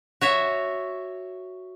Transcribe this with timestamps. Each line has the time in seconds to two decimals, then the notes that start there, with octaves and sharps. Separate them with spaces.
0.21 F#4 C#5 E5